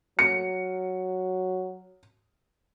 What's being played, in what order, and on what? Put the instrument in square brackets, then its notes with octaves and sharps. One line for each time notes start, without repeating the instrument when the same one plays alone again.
[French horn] F#3 [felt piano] C#7